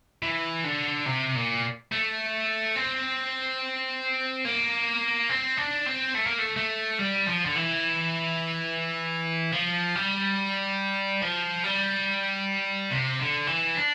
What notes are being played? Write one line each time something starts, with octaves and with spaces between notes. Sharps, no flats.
E3
D3
C3
A#2
A3
C4
A#3
C4
D4
C4
A3
A#3
A3
A3
G3
F3
D3
E3
F3
G3
F3
G3
C3
D3
E3
D4